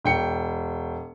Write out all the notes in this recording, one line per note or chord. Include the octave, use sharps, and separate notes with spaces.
E1 G5 C#7